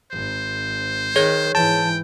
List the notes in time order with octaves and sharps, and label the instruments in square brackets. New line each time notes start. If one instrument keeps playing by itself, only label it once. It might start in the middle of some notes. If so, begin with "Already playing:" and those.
[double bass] G#1 [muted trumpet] C5
[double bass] D#3 [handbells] G#4 C#5 G#6
[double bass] G#2 E3 [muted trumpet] G5 [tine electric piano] A5